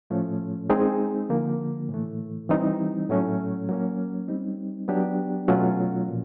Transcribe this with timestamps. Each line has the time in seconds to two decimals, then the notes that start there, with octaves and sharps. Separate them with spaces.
0.10 A2 F3 A3 C#4
0.70 G#3 C4 D#4 G#4
1.29 D3 F3 A#3
1.89 A2 E3 A3
2.49 E3 G3 C4 D#4
3.09 A2 F#3 A3 C#4
3.69 F#3 A#3 C#4
4.28 G3 C4 D#4
4.88 F#3 B3 D4 G4
5.48 B2 F#3 A3 C#4 F4
6.08 A#2 F3